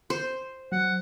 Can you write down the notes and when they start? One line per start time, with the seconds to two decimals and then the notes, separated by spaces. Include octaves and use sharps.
0.10 C5
0.72 F#3 F#5